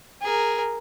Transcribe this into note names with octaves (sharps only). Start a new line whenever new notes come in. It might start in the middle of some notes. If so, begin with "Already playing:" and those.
G#4 A#4